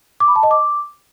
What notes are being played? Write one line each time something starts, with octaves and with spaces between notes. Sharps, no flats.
D6
B5
A5
D#5
D6